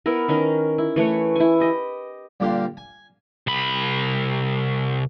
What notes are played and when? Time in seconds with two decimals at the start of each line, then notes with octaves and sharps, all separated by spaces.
0.06 B3 E4 A#4
0.28 D#3 C#4 A#4
0.78 E4
0.96 E3 A3 B4 C#5
1.36 E4 G#5
1.60 G4 D#5
2.40 G2 A#2 D3 G4 F5 C6
2.77 G#5
3.47 C2 B5